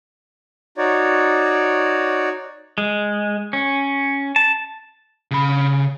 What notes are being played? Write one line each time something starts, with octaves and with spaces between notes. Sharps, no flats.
D#4 F#4 C#5 D5
G#3
C#4
A5
C#3 B5